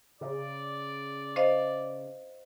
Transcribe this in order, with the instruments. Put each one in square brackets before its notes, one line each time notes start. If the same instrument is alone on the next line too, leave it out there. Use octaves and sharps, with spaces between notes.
[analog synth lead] C#3 [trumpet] D5
[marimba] C5 D#5 F5